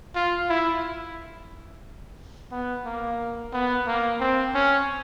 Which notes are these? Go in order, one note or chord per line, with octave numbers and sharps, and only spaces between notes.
F4
E4
B3
A#3
B3
A#3
C4
C#4